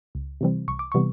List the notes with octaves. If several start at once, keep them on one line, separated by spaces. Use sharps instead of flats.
C#2
C3 E3 G3 C4
C2 C#6
D6
C3 E3 G3 B3 C#6